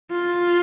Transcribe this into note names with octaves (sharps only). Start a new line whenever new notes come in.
F4